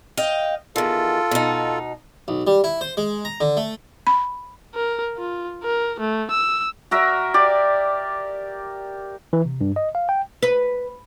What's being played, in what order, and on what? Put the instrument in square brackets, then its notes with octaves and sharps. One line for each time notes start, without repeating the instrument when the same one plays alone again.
[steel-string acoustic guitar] D#5 F5 G5
[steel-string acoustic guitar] E2 D#3 [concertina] F4 A4
[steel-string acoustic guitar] B2 D#4
[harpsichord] B1
G3
E4
C5
G#3
A#5
D3
A3
[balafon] B5
[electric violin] A#4
F4
A#4
A3
E6
[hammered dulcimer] F#4 A#4 E5
G4 D5
[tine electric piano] E3
C3
G2
D#5
F5
G5
[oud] B4